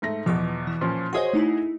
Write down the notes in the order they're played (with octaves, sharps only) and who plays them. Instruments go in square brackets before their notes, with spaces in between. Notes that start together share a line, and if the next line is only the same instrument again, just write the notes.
[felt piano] G#2 A3 A#6
[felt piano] E2 B2 [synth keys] F3 D6
[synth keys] E3
[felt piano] A#2 F3 C#4
[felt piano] F#4 G#4 D#5 [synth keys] C5 C#5 C6
[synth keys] A3 D#4 E4